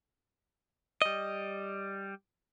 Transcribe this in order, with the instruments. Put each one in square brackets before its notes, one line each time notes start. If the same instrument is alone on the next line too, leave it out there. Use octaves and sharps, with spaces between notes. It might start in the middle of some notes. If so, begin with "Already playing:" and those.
[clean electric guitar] G3 D#5